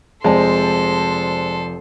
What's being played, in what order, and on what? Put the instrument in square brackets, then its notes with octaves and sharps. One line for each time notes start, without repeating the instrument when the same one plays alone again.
[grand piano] F1 C4 [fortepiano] G#3 [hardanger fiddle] A4 C6 [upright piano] C5 D5 A5